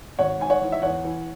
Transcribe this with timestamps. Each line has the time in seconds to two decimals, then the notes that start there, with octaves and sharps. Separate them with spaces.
0.19 G#1 C#5 F#5
0.40 G#2 G#5
0.50 C#5 F#5
0.61 E3
0.72 E5
0.82 E2 C#5 F#5
1.04 E3